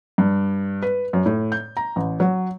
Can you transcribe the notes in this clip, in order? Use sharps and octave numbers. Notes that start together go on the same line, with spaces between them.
G2
B4
F#2
A2
G6
A#5
A1
F#3